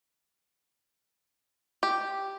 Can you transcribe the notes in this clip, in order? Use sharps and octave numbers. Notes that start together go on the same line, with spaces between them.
G4